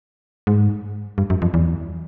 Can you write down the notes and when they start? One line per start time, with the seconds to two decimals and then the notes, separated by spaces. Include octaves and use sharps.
0.47 G#2
1.18 G2
1.30 F#2
1.42 F2
1.54 E2